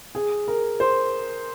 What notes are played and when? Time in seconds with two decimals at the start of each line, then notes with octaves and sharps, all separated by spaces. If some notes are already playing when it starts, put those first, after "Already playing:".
0.15 G#4
0.48 A#4
0.80 C5